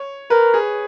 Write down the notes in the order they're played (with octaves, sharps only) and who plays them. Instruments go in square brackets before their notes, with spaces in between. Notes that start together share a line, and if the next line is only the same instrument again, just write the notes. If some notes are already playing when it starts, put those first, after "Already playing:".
Already playing: [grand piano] C#5
[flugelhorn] A#4 [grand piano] B4
[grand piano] G#4